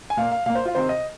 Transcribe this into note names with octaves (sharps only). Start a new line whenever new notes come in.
G#5
A#2 A#3 F5
F5
A#2 A#3 F5
C5
F4
C3 D#3 C4 C5
D#5